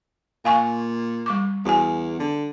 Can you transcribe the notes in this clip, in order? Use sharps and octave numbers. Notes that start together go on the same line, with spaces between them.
A#2 F5 G#5 C#6
G3 C#6 D6
E2 F#4 G#5
D3